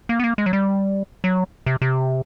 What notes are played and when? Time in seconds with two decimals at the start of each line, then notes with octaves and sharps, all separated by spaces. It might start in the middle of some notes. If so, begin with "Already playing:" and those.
0.09 A#3
0.19 B3
0.24 A#3
0.38 G#3
0.46 F#3
0.53 G3
1.24 F#3
1.66 C3
1.82 C3